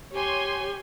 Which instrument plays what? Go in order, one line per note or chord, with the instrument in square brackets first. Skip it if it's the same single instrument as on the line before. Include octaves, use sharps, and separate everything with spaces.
[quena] G4 [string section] C#5 G#5 C6